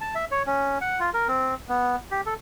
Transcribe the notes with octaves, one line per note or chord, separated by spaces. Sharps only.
A5
E5
C#5
C#4
F#5
F4
A#4
C4
B3
G4
A4